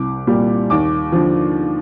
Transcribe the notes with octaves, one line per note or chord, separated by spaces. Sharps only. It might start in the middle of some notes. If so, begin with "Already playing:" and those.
Already playing: C2 D6
A#2 G3
D#2 D6
D3 F3